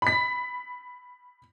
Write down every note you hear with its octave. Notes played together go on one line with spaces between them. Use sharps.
B5 B6